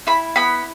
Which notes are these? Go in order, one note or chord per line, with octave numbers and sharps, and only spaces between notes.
E4 B5
B3 B5